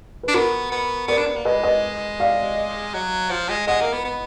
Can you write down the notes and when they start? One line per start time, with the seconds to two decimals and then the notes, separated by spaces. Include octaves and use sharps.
0.23 D4 B4
0.34 B3 F#4 A#4
0.71 B3
1.08 B3 A#4 D5
1.17 D4
1.26 B3
1.36 A#3
1.45 G#3 B4 D#5
1.63 B4 D#5
2.20 D5 F5
2.94 F#3
3.30 F3
3.49 G#3
3.67 G#3 D#5 F#5
3.81 A#3
3.93 B3
4.04 B3